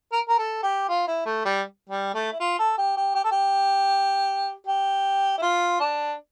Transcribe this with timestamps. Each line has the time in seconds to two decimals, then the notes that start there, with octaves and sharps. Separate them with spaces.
0.12 A#4
0.29 A#4
0.38 A4
0.63 G4
0.89 F4
1.07 E4
1.26 A3
1.45 G3
1.89 G3
2.14 A3
2.32 E4
2.40 F4
2.59 A4
2.78 G4
2.97 G4
3.15 G4
3.24 A4
3.32 G4
4.67 G4
5.38 E4
5.42 F4
5.80 D4